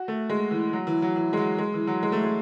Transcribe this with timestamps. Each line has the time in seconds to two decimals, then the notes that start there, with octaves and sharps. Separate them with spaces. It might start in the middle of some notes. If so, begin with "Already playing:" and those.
Already playing: F#4
0.08 A3
0.30 G#3
0.51 E3
0.73 F#3
0.87 E3
1.02 F#3
1.16 E3
1.33 G#3
1.37 F#3
1.59 G#3
1.74 E3
1.87 F#3
2.03 G#3
2.12 A3
2.24 G#3